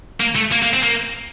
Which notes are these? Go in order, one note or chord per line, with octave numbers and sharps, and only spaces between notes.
A#3
A3
A#3
A#3
C4
A#3